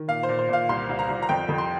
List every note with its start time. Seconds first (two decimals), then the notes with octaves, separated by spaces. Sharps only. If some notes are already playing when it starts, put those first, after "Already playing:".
Already playing: D#3
0.08 A#2 F5
0.23 C5
0.29 A#2
0.39 C5
0.49 A#2 F5
0.69 C2 C6
0.89 C2
0.99 A#5
1.09 C2
1.22 A#5
1.29 F2 G5
1.49 F2
1.58 C6